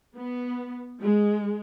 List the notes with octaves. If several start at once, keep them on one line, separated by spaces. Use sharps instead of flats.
B3
G#3